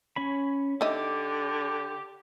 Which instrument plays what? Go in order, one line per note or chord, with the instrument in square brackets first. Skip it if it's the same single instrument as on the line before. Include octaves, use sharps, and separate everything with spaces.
[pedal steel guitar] C#4 C#5 B5
[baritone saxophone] D3 [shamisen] D#4 D#5 E5 [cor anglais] G4 [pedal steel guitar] D6